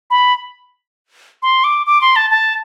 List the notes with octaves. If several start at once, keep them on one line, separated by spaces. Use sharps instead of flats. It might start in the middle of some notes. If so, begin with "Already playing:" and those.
B5
C6
D6
D6
C6
A5
A5